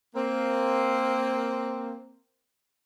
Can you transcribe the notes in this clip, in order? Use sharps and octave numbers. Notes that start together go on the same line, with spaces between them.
A#3 C4